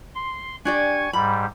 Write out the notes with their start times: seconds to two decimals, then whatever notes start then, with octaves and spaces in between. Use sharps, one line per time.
0.15 C6
0.65 D4 G4 D5 G#5 C#6 G#6
1.13 G#2 G3 B5